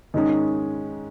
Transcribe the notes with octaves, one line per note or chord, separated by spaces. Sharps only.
G#2 D#3 G#3 C#4